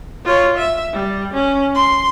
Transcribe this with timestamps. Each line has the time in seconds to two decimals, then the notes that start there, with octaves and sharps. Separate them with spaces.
0.25 F4 C#5
0.58 E5
0.93 G3
1.34 C#4
1.75 C6